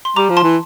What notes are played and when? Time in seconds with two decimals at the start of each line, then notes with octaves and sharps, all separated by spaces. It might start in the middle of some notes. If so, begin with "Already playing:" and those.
0.05 C6
0.16 G3 A#5 D6
0.30 F3
0.37 A5 C6
0.43 E3